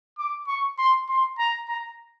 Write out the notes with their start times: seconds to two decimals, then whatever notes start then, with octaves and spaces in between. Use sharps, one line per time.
0.18 D6
0.47 C#6
0.78 C6
1.09 C6
1.39 A#5
1.69 A#5